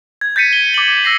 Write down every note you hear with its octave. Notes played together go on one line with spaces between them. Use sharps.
G#6
G6 A6 B6 C#7 D#7
G7
D6 F#7
E6 A#6 C7